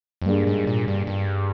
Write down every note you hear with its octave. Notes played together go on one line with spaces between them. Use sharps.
F2
G2 G3 A#3 D4 G#4
G#2
A#2
G2
G2